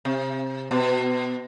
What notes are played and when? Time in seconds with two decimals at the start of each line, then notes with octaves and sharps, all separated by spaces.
0.05 C3
0.71 B2